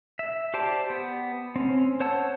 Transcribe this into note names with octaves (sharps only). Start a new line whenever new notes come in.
E5
G4 C5 D5 A5
B3
C4 C#4
C5 C#5 F#5 A5 E6